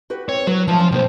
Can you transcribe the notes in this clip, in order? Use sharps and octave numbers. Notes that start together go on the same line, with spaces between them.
F#4 G4 B4
C4 C#5
F#3 F#4 B4
F3 A3 A5
C#4 F4
B1 A#2 C4 C5